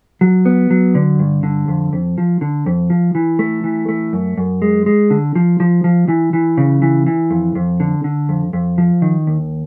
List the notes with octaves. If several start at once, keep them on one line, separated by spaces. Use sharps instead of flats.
F#3
B3
F#3
D3
G2
D3
F2
F2
F3
D3
F2
F3
E3
A3
E3
A3
F#2
F#2
G#3
G#3
D3
F3
F3
F3
E3
E3
C#3
E3
E3
F2
F2
D3
D3
F2
F2
F3
D#3
D#2